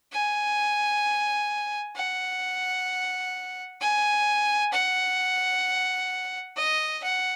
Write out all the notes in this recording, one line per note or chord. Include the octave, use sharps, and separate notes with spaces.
G#5
F#5
G#5
F#5
D#5
F#5